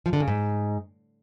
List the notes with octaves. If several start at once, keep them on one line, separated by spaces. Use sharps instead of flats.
F3
D3
C#3
G#2